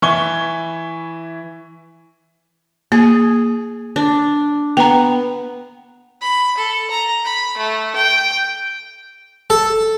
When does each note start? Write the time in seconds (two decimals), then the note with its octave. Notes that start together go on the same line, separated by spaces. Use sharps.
0.02 E3 E4 C#6 G#6 G7
2.92 A#3 G#4
3.96 D4
4.77 B3 G5 A#5
6.22 B5
6.58 A4
6.91 A#5
7.25 B5
7.57 A3
7.96 G5
9.50 A4